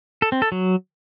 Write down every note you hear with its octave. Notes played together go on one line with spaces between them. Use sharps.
A4
C4
A4
F#3